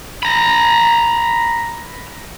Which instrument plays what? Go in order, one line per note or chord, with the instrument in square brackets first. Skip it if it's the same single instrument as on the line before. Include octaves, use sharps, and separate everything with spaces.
[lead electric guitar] A#5 B5